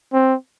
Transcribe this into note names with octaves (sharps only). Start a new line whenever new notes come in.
C4